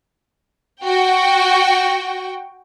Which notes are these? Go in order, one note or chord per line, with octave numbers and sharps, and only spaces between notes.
F#4 G5